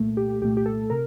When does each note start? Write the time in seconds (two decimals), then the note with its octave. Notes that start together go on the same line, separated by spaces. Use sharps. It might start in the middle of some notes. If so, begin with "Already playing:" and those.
Already playing: C2 A#2 A3
0.17 G4
0.41 C2 A#2 A3 G4
0.57 G4
0.66 A4
0.90 C3 A#4